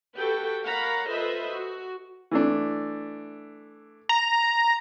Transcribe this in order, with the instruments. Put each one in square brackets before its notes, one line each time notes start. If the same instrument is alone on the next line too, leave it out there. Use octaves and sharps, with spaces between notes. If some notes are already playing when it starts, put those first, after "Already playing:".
[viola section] F#4 G4 A4 B4 G5
A#4 C#5 F5 F#5 A#5 B5
F4 A4 B4 C5 D#5 E5
F#4
[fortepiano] E3 A3 D4
[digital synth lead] A#5